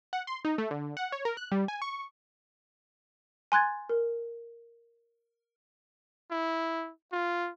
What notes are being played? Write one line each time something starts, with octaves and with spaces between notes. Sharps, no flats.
F#5
C6
D#4
A3
D3
F#5
C#5
A#4
F#6
G3
G#5
C#6
G#5 C6 F#6 G#6 A6
A#4
E4
F4